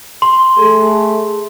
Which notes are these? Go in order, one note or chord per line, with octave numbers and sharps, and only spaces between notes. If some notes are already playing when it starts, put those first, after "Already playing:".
C6
A3 G#4 A4